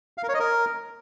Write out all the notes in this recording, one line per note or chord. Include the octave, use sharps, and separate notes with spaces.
F5
A#4
C#5
D#5
A#4